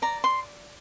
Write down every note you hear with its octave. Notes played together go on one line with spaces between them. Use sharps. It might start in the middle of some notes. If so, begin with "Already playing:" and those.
D5 A#5
C6